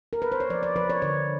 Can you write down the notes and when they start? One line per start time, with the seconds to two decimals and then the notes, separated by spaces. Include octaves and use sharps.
0.13 A#4
0.22 B4
0.32 C5
0.40 C#5
0.50 F3 D5
0.63 D5
0.76 F3 B4
0.90 C#5
1.02 D3 C#5